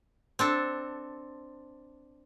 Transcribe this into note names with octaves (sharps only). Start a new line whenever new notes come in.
C4 D4 A4